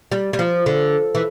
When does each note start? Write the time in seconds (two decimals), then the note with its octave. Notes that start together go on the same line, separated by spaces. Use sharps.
0.12 G3
0.33 G3
0.39 F3
0.66 D3
1.15 E3